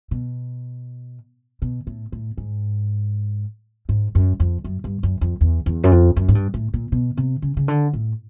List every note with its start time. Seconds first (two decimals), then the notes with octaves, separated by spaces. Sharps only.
0.11 B2
1.62 B2
1.87 A2
2.12 A2
2.38 G#2
3.89 G#2
4.15 F#2
4.40 F2
4.64 F#2
4.84 G2
5.03 F#2
5.21 F2
5.41 E2
5.66 E2
5.84 F#2
5.91 F2
6.16 F#2
6.28 G#2
6.35 G2
6.54 A2
6.74 A#2
6.92 B2
7.17 C3
7.42 C#3
7.57 C#3
7.68 D3
7.93 A2